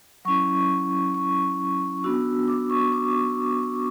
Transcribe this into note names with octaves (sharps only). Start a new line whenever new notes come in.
F#3 C#4 E4 C#6
C#6
B3 D4 F#4 E6
D6
C#6
D6